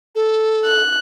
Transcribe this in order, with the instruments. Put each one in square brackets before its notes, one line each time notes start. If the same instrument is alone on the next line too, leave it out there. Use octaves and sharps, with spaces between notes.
[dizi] A4
[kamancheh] F#6